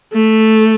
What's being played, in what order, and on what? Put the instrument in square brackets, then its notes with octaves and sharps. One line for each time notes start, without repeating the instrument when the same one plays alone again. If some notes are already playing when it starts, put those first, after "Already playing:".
[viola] A3